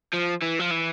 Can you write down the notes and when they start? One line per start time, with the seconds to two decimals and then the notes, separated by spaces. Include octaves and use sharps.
0.13 F3
0.42 E3
0.60 F3
0.71 E3